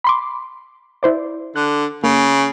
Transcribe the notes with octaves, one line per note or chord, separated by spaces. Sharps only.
B5 C6 D6
E4 C5 D5
D3 F#6
C#3 A#3